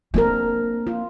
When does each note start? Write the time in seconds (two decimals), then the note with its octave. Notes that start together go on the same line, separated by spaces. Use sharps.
0.14 A#3 C4 D4 A#4
0.87 F4